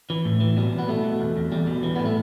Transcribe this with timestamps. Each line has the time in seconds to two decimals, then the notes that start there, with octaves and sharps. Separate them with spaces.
0.10 E3
0.25 A2
0.41 E3
0.57 B2 G3
0.72 B2
0.78 B3
0.89 B2 A3
1.04 B2
1.20 E2
1.37 E2
1.52 E2 G3
1.67 B2
1.83 E3
1.96 A2 B3
2.05 A3